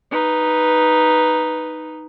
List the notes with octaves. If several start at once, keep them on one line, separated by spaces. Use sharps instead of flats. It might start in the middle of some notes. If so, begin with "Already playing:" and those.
D#4 B4